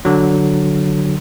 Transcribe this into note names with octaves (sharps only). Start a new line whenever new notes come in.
D3 F#3